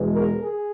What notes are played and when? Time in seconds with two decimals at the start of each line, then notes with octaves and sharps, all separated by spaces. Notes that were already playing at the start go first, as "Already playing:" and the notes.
Already playing: E2 B2 G#3
0.13 A#4
0.43 G#4